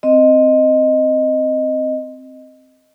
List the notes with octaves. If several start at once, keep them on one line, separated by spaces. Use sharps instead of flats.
C4 D#5